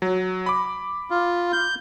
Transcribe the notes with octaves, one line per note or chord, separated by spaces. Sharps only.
F#3
B5 D6
F4
G6